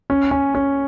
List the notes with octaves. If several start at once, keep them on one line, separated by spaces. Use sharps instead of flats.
C#4
C#4
C#4